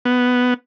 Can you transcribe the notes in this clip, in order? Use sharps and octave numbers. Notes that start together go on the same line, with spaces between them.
B3